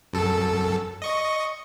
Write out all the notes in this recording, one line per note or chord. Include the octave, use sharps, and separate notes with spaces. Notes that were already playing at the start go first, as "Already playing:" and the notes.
F#2 A4
D#5 C#6